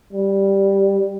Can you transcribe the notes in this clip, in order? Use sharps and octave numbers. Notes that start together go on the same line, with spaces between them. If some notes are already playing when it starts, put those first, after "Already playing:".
G3